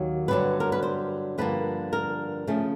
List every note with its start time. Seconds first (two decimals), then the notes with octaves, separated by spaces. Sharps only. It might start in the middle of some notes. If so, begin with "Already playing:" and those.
Already playing: D#2 D#3 F#3
0.28 G2 D3 F#3 B4
0.60 A#4
0.72 B4
0.83 C5
1.38 G2 D3 F3 A#3 B4
1.93 A#4
2.47 C#3 F3 A3 C#4